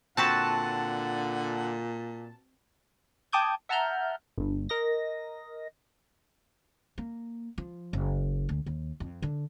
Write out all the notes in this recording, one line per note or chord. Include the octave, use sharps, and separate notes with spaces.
A#2 D3 C4 F#4 B4 F#5 A5
G5 A5 D6 D#6 G6 G#6
E5 F#5 A5 A#5 F6 G6
G1 G2
A#4 D#5 A#6
A#3
F3
F#1
D2
D#2
F2
D3